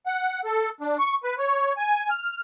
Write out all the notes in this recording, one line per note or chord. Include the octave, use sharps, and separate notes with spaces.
F#5
A4
D4
C#6
B4
C#5
G#5
F6